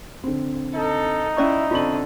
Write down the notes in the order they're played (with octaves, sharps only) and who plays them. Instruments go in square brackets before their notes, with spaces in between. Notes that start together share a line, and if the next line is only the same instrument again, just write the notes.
[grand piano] D3 C4
[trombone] D#4 [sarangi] A4
[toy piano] C#4 D5 C#6 [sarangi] E4
[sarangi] D3 [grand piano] C4 C#6 F#7 [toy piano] F4